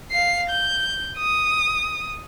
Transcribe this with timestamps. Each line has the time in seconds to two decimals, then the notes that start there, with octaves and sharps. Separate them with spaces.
0.11 F5 C7
0.50 G6
1.18 D#6